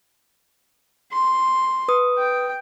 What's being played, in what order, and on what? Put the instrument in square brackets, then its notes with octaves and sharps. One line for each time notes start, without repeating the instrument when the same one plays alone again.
[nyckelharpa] C6
[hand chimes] B4 D#6
[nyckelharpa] G5